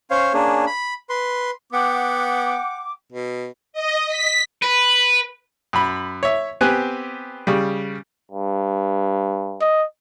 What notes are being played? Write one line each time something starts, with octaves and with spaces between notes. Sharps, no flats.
C#4 C5 C#5 F5
A#3 C#4 D4 G#4
B5
B4 C6
B3 F#5 G5 D6
B2
D#5
B6
B4
F#2 B5
C#5 E5
B3 C4 G4 G#5 F#6
C#3 G3
G2
D#5